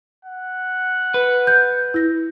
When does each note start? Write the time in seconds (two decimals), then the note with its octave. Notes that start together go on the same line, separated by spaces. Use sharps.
0.24 F#5
1.14 B4
1.47 G6
1.94 E4 A#6